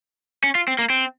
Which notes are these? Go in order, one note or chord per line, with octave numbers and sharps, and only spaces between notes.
C#4
F4
C4
A#3
C4